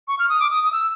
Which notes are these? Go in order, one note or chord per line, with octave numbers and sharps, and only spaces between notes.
C#6
F6
D#6
D6
D#6
D#6
E6